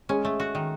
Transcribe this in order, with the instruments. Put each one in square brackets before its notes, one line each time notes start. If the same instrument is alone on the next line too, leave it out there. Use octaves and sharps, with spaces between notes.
[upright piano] G#3 [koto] C#4
[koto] A3
F#4
D#3